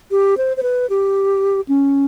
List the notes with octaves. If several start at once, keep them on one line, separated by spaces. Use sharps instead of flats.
G4
C5
C5
B4
G4
C#4